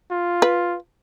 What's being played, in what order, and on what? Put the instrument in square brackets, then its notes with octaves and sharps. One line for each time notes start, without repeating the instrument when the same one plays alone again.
[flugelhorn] F4
[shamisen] B4